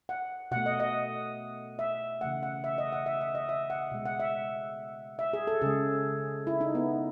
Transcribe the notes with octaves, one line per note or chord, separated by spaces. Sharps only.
F#5
B2 A3 F#5
D#5
D#5
E5
C#3 E3 A3 F#5
F#5
E5
D#5
F#5
E5
E5
D#5
E5
F#5
B2 G#3
F#5
E5
E5
G#4
A4
C#3 G#3 G#4
E4
D#4
B3